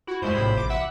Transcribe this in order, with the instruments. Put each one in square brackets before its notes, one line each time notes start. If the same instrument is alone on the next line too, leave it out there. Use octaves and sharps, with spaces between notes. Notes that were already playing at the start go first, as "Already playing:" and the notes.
[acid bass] E4 [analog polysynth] F#4
[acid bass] F#2 [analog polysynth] G3 G#3 E4 [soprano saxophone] C5
[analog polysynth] A#1 C3 B5 [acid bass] A2
[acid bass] A1 [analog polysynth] D6
[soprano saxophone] E5 [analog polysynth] F#5